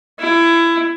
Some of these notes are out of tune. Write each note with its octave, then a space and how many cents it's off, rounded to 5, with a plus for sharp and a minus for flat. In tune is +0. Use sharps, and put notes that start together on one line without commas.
E4 +20